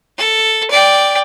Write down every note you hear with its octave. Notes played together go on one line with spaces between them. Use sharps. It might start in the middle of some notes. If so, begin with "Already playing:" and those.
A4
D5 G5